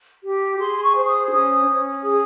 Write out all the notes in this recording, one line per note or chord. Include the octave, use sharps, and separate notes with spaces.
G4
G#4 C6
C6
C#6
C5
D#6
C#4 D#6
C#4
G#4 D#6